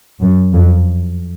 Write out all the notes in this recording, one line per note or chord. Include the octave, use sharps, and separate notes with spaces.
F#2
F2